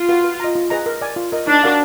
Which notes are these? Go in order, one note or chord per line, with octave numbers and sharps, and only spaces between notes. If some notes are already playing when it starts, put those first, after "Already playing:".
Already playing: F4
F#4 B4 F5
B4
D#5 A#5
F4
G#4 B4 D#5 A#5
A#4
D5 G#5
F4
A#4 D#5
D4 D#4
F#4 A#4 D5 F5